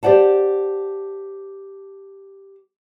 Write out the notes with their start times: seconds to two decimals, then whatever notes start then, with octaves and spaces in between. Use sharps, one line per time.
0.03 G4 C5 D5 F#5 A5